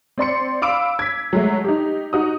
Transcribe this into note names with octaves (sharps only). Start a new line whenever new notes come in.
C4 D5 C6 C#7
F5 B5 D6 E6 D7
G#6 B6
F#3 G#3 A3
D#4 G4
D#4 F#4 D#6